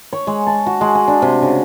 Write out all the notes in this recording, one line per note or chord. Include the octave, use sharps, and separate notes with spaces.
C#5
G#3
A5
F#4
G#3
G#5
D4
C3
C#3